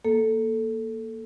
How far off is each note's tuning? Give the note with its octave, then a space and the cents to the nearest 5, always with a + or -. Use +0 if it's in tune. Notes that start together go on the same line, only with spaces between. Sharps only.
A#3 +0 A4 +0